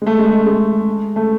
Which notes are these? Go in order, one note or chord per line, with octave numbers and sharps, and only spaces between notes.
G#3
A3
G#3
A3
G#3
G#3
A3